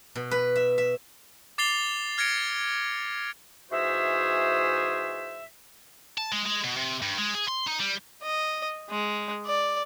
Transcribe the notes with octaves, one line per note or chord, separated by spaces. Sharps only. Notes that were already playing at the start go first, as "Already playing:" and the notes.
B2
B4
E5
E5
D6 A6 C7 F7 G7
F6 G#6 A#6 C#7 D7
G#2 E3 F#4 G#4 C5 E5
A5
G#3
G#3
B2
C3
G2
G#3
G#4
C6
D#4
G3
D#5
G#3
D5